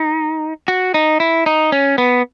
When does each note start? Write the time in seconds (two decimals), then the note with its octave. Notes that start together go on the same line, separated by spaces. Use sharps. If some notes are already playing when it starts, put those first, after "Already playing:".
Already playing: D#4
0.68 F#4
0.94 D#4
1.20 E4
1.46 D#4
1.72 C#4
1.98 B3